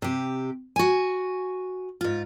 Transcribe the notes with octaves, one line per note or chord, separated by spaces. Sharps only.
C3 G4
F#4 G#5
G#2 F4